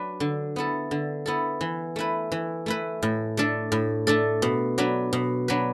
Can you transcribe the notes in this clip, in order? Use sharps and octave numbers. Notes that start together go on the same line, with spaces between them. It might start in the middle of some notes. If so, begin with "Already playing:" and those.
Already playing: F#3 D4 B4
D3
B3 E4 A4
D3
B3 E4 A4
E3
A3 E4 B4
E3
A3 E4 B4
A2
A3 D4 A4
A2
A3 D4 A4
B2
F#3 D4 B4
B2
F#3 D4 B4